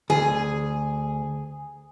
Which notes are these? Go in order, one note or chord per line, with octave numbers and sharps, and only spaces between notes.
D2 G#4